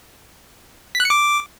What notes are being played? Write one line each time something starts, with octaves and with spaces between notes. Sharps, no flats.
B6
F#6
C#7
D6